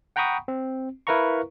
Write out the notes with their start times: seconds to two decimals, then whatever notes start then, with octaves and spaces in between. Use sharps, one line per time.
0.16 F#5 G5 A#5 B5 C#6 D#6
0.48 C4
1.07 E4 A#4 B4 F5 A#5 C#6